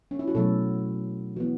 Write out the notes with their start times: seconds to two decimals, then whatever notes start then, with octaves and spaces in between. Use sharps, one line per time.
0.11 C#4
0.19 E4
0.28 F#4
0.35 B2 F#3 A3 C#4 A4
1.36 E3 B3 F#4